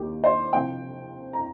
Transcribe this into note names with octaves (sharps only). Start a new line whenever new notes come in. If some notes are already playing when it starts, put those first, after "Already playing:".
Already playing: D#2 D#3 A#3 G4
C5
C3 F3 C4 G5
A#5